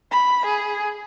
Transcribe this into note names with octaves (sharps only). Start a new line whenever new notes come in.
B5
G#4